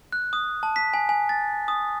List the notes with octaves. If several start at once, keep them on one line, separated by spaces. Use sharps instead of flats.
F#6
D#6
A5
B6
G#5
G#5
A6
D#6